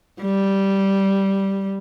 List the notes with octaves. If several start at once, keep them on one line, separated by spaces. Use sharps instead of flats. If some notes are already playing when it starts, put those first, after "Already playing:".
G3